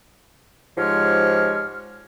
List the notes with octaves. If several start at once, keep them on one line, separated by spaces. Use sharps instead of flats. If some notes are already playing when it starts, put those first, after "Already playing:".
G#2 F3 G#3 G4 C#5 F6